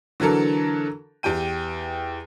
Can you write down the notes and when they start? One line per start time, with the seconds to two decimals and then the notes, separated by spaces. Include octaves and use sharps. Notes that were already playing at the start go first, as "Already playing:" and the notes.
0.20 D3 E3 F#3 A4 A#4
1.23 E2 G4 G5 D#7